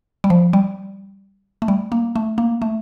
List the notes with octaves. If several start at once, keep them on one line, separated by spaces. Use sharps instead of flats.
G3
F3
G3
A3
G3
A#3
A3
A#3
A3